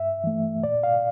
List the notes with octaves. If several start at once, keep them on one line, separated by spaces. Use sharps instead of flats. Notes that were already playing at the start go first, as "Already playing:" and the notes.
Already playing: G2 E5
E3 A3
A#2 D5
F5